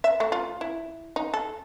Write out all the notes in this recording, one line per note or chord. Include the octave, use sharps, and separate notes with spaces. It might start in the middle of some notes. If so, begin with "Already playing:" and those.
E5
A3
F4
E4
D#4
A4